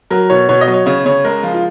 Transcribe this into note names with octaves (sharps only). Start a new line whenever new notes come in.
F#3 A#4
B2 C#5
B2 C#5
D#5
F#3
C#5
C#3 C#5
C#3 C#5
G#3 A#4
F3 F4
F4